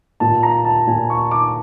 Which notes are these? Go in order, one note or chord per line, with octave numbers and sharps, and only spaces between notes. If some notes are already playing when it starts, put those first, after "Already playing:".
A#2 A5
A#5
A5
A#2 G#5
C#6
D6